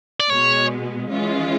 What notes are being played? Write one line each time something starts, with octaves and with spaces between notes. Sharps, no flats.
D5
B2 G#3 B3 C#5
E3 G#3 C#4 F4